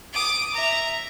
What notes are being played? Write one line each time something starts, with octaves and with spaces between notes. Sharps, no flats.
D6 D#6
E5 A#5